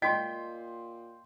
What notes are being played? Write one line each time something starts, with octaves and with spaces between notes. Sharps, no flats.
A#2 D#5 G5 C6 B6